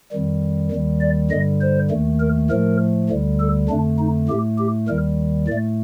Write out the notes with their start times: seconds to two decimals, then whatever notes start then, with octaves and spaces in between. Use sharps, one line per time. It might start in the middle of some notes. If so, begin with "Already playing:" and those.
0.12 F2 D#3 G3
0.71 D#2 D#3 G3
1.01 D5
1.31 G2 D3 G3 D#5
1.61 C5
1.91 D#2 D#3 A3
2.20 A#4
2.50 A2 F3 A3 A#4
3.10 D2 D3 G3
3.40 A4
3.69 F2 D3 A3 D4
3.99 D#4
4.29 A2 A3 G4
4.58 G4
4.89 D#2 D#3 G3 A#4
5.48 A2 D5
5.52 A3